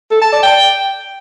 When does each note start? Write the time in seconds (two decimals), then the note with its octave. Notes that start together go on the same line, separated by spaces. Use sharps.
0.11 A4
0.22 A5
0.32 D5
0.43 G5